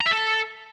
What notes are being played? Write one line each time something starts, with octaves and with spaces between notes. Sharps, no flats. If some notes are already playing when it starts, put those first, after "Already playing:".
A#5
E5
A4